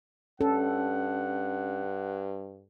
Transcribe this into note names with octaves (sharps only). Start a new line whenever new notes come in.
G2 C#4 A4 F#5